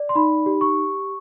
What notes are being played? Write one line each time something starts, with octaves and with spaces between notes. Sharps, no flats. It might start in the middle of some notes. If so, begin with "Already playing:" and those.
Already playing: D5
C6
D#4 B5
G4
C#6